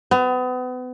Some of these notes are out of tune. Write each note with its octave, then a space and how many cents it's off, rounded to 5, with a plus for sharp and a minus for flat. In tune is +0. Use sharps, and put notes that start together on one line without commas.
B3 +35